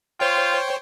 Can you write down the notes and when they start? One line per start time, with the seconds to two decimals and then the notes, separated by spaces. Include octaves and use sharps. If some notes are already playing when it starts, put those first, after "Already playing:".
0.20 F4 C5 C#5 G5